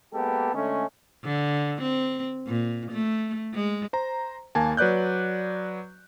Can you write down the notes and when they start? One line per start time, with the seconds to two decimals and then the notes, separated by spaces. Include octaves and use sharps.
0.14 G#3 A#3 B3 G4 A4
0.54 D3 G#3 A3 C#4
1.24 D3
1.82 C4
2.47 A#2
2.92 A3
3.54 G#3
3.93 C5 A#5
4.55 D#2 A#3 G#5 A5
4.77 F#3 B4 D5 F#6 G6